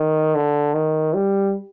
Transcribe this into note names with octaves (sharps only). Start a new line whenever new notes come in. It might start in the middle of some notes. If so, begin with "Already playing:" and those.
Already playing: D#3
D3
D#3
G3